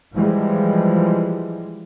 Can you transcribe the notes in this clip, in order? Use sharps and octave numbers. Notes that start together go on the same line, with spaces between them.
E3 F3 G3 G#3